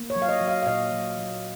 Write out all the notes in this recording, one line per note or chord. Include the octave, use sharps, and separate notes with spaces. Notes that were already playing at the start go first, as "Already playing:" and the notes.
Already playing: A#3
C#5
F#3
F5
D#5
F#3
F5
F5
A#2 D#5
F#3
F#3